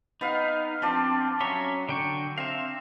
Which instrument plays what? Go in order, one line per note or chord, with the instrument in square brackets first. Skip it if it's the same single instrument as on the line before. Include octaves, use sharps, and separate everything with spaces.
[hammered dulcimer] B3 B4 F5 [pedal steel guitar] D#4
[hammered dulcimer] F3 D4 D5 [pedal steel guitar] C4
[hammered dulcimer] F#3 C6 [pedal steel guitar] C#4 C#5 E5
[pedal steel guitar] D3 G5 C#6
[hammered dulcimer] C4 [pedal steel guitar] E5 F5